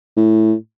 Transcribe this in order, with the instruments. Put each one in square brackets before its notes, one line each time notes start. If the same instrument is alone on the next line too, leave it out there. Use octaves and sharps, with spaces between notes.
[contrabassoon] A2